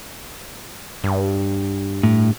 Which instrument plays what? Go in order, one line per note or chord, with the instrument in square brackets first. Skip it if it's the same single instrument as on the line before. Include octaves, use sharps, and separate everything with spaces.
[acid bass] G2
[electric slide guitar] A2